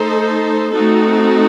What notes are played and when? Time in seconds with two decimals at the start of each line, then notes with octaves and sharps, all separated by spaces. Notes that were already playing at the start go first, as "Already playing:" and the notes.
Already playing: A3 D#4 A4 C5
0.72 A3 C4 D#4 F#4 A4